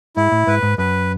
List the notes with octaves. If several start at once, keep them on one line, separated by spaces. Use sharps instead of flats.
G#2 E4
A2
G#2 B4
G#2
F#2 B4